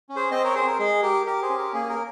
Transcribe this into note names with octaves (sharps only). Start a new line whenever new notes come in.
C#4
G#4 C5
C4 C5 D#5
A#4 C#5
G#4 C5
A#4
G#3 G#4
G4 A#4
G4 A#4
G#4 C5
C#4
A#4
A#3 G#4
A#4